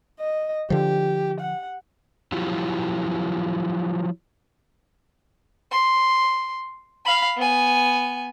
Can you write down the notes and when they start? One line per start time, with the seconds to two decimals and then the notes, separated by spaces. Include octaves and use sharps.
0.19 D#5
0.70 D3 F3 G4
1.40 F#5
2.32 F3 F#3 E4 F4 G4
5.71 C6
7.05 F5 B5
7.37 B3 G#5